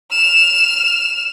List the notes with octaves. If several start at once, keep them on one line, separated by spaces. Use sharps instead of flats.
F6 E7